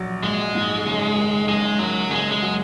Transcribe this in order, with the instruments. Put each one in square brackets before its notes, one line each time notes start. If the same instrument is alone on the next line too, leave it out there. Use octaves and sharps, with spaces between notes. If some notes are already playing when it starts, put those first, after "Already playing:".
Already playing: [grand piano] A#1 F#3
[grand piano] A#1 [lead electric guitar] G#3
[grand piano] G#2
F#1
D#3
[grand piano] F#1 [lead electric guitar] G#3
[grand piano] F#2 [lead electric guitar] F#3
[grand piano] F#1 [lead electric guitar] G#3
[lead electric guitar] G#3
[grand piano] F#3